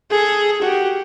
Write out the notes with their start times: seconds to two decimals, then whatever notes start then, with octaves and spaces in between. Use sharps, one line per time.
0.10 G#4 A4
0.61 F#4 G4